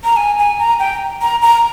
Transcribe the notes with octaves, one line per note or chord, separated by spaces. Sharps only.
A#5
G#5
G#5
A#5
G5
A#5
A#5